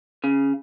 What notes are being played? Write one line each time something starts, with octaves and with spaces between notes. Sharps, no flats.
C#3